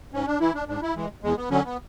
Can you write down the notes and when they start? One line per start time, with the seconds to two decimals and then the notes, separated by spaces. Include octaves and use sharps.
0.13 G#2 C#4
0.27 D4
0.40 E3 E4
0.54 D4
0.68 G#2 D4
0.82 E4
0.96 E3 G#3
1.23 E2 G#3
1.37 B3
1.50 D3 F#3 C#4
1.65 B3